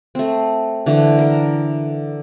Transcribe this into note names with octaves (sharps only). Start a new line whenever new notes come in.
A3 C4
D3 E3 A3
A#4